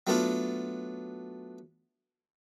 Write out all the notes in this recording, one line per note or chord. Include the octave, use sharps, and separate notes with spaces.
F#3 A3 B3 D4 F4